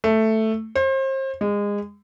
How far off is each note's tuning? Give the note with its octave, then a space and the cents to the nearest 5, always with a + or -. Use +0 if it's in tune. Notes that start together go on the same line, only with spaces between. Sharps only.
A3 +5
C5 +35
G#3 -25